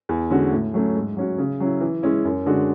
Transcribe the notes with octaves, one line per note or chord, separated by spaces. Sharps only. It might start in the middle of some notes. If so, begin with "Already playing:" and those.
E2
D3 G#3 C#4 F#4
A2
F#3 A3 C#4
G#2
F#3 C#4 F#4
C#3
F#3 C#4 E4
E3
G#3 C#4 E4
F#2
D3 G#3 D4 F#4